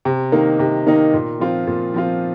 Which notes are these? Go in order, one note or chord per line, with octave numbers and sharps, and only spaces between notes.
C3
D#3 A#3 D#4
C3
D#3 A#3 D#4
A#2
F3 C4 F4
A#2
F3 C4 F4